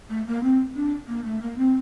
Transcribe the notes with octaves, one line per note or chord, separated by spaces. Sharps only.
A3
A#3
C4
D4
A#3
A3
A#3
C4